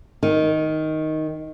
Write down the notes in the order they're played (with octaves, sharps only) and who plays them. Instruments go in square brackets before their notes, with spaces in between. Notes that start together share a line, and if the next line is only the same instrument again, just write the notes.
[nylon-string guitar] D#3